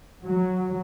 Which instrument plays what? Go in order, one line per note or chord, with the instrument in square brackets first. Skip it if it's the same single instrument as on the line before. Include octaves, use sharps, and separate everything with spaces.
[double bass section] F#3